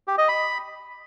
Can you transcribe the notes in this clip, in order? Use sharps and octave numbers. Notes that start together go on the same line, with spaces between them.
G4
D#5
B5